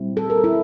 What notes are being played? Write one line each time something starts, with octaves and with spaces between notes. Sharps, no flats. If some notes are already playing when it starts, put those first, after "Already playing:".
Already playing: A#2 G3 C4 E4
A4
A#4
E4